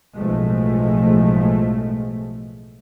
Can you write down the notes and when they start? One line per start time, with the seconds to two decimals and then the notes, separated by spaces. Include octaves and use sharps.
0.16 B1 A2 F3 G#3 A3